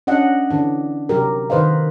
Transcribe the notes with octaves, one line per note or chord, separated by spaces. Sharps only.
C#4 D4 D#5 F#5
D3 E3 D4
C3 F#3 G4 A#4
D#3 B4 C5 D#5 F5